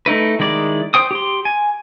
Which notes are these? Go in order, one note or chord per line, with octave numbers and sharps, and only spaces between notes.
A3 D#4 E4 B4
D#3 G#3 E4 D5
C5 G5 D#6
G4 C6
G#5